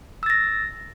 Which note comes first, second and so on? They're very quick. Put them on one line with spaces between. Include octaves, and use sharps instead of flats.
E6 A6 A#6